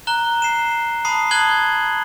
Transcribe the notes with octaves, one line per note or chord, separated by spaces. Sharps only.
A#5 F#6 G7
C7 E7
A5 B5 D#6 C7
A5 D#6 F#6 G#6 F#7 G7